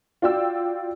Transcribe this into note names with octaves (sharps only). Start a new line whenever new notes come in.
F4 F#4 D5 G5 E6